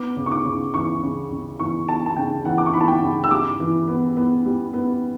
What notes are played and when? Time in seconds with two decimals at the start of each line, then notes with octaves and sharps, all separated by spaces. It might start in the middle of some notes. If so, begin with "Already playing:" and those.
Already playing: B3 D6
0.17 C#3
0.26 C#6
0.31 D6
0.45 C#3
0.74 E3 C#6
1.03 C#3
1.31 C#3
1.59 E3 C#6
1.88 E3 A5
2.06 A5
2.16 C#3 G5
2.45 E3 F#5
2.58 D6
2.66 C#6
2.74 E3 B5
2.81 A5
2.88 G5
3.02 C#3
3.24 E6
3.31 G3 D6
3.60 E3
3.88 B3
4.17 B3
4.45 G3
4.73 B3